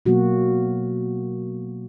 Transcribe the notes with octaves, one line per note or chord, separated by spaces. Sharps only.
B2 F#3 A#3 F#4